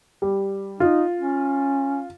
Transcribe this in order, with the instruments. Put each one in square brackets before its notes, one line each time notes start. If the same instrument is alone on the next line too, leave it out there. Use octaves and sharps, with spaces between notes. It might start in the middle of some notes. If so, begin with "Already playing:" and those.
[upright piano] G3
[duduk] D#4 [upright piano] F4
[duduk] C#4